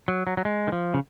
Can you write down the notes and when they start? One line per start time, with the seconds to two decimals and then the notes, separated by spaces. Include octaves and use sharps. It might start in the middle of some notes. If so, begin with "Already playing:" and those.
0.08 F#3
0.27 F#3
0.37 F#3
0.45 G#3
0.67 D#3
0.72 F3
0.94 C#3